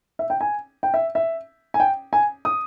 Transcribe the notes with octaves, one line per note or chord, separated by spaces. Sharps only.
E5
G5
G#5
G5
E5
E5
G#5
G5
G#5
D#6